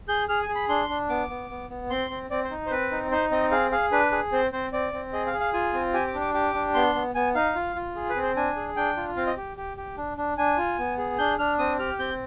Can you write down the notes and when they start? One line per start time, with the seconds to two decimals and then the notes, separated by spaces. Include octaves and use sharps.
0.08 G#4 G6
0.29 G#4 F6
0.42 G#5
0.48 G#4
0.55 B5
0.69 D4 C6
0.89 D4
1.09 B3 D6
1.30 B3
1.50 B3
1.70 B3
1.90 C4 C6
2.10 C4
2.30 C4 D5
2.44 C5
2.51 D#4
2.66 C5
2.71 C4 B4
2.91 D#4
3.11 D#4 C5
3.31 C4 D#5
3.51 G#4 F5
3.71 G#4 F5
3.92 D4 B4
4.12 G#4
4.32 C4 C5
4.52 C4 C5
4.73 C4 D5
4.93 C4
5.13 G#4 D#5
5.27 F5
5.33 G#4
5.40 F5
5.53 F4 G#5
5.73 C4
5.94 G4 G#5
6.07 D6
6.14 D4
6.21 D6
6.34 G4 D6
6.54 D4
6.75 B3 C6
6.95 B3
7.15 B3 G#5
7.35 D#4 F5
7.55 F4
7.75 F4
7.96 G#4
8.09 B4
8.16 C4
8.23 C5
8.36 D4 G#5
8.56 G#4
8.76 D4 G5
8.97 F4
9.16 C4 F5
9.27 D#5
9.37 G4
9.57 G4
9.77 G4
9.97 D4
10.17 D4
10.38 D4 G#5
10.57 F4
10.79 B3
10.98 G#4
11.19 D4 G6
11.39 D4 F6
11.59 C4 D#6
11.79 G4 F6
11.99 C4 G6